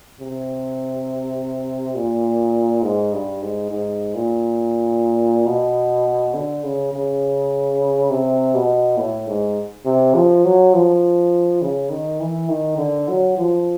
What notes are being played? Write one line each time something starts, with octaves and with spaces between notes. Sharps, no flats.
C3
A#2
G#2
G2
G#2
G#2
A#2
B2
D3
C#3
C#3
C3
B2
A2
G#2
C3
F3
F#3
F3
C#3
D#3
E3
D#3
D3
F#3
F3